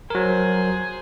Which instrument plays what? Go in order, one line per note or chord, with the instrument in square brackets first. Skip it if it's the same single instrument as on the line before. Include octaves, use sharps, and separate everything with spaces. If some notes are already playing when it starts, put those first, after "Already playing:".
[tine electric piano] F#3 A#4 [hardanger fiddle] G#4 C5